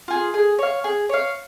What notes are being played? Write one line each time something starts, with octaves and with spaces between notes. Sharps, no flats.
F4 G#4
G#4
C#5 F5
G#4
C#5 F5